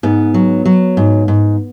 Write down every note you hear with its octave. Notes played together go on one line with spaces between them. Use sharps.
G#2 B3
F#3
F#3
G#2
G#2